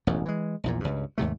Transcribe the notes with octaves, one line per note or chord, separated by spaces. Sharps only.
E1 A1 F#2
E3 G#3
A#1 E2 A#2
C#2 G2
D#2 G#2 C3 A3